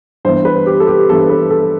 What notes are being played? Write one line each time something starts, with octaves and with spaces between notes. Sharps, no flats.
G2 E3 B3 C5
B4
G4
A4
G4
G2 E3 B3 A4
B4
A4